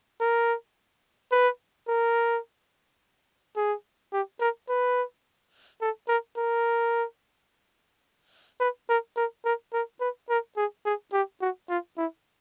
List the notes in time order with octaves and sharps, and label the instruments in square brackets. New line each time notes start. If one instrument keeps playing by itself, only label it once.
[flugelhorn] A#4
B4
A#4
G#4
G4
A#4
B4
A4
A#4
A#4
B4
A#4
A#4
A#4
A#4
B4
A#4
G#4
G#4
G4
F#4
F4
E4